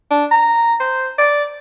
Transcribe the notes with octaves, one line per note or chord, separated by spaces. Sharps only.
D4
A#5
C5
D5